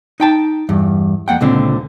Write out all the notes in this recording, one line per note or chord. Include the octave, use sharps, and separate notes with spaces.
D#4 G5 A5
E2 G2
F2 A#3 F#5 G5
C#2 A#2 D3 C4